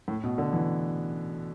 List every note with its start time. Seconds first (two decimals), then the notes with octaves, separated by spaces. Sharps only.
0.08 A2
0.24 B2
0.38 D3
0.53 E3